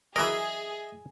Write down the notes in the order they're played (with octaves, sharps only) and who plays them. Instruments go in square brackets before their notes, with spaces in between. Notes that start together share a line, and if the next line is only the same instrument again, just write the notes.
[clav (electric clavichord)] E3 F#3 A#4 [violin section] G#4 [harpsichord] D#5 E5